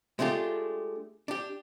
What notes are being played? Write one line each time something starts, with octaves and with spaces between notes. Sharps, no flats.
G#3 A3 D4 F4 G4
D4 G4